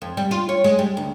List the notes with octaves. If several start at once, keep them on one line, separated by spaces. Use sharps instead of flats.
F2
G3
F4
C#5
G#3
G3
D2